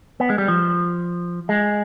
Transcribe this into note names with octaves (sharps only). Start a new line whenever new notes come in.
B3
G#3
G3
F3
G#3